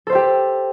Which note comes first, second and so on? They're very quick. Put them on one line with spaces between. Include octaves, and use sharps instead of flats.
A4 C5 E5 G4